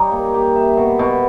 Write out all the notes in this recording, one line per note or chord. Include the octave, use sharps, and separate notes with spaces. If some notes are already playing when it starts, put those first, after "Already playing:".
Already playing: G3 D#4 C#5
A#3
G4
E5
B2
B2